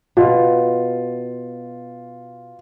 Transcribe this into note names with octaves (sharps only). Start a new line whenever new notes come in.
B2 F4